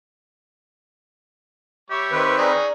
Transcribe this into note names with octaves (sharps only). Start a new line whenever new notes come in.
G3 G4 C#5 E5
D#3 C4 B4
C#4 D#4 G#4 D5 A#5 C#6